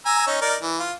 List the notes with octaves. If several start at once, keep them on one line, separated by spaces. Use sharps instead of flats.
G#5 A#5 E6
C#4 D#4
D#4 A#4 D5
E3
F4